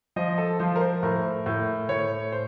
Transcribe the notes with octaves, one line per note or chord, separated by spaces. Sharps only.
F3 D#5
A4
F3 C5
A#4
C5
A2 A#4
A2
A2 C#5
C5